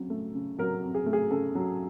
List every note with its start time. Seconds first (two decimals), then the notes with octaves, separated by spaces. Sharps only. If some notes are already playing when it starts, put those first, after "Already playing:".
Already playing: F2 C#3 F#3
0.10 A3
0.34 C#3
0.58 F#3 A#4
0.82 F2
0.95 G#4
1.06 A3
1.13 G#4
1.30 C#3 A4
1.55 F#3